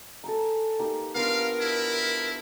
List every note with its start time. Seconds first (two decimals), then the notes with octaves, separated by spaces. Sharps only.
0.24 A4 G#5 A#5
0.79 A#3 D#4 G4
1.15 B3 D4 F4 A#4 F5
1.61 E4